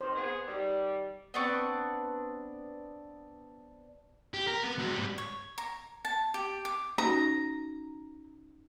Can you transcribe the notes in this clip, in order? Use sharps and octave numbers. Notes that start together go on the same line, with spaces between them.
D#3 C5
B3 G#4
D#3 G3
B3 C4 D4 C#6
G4
A#4
B3
G#3 F#4
G#2 G3
C#5
A#5
A5
G4
D6
C#4 D#4 F#4 A#5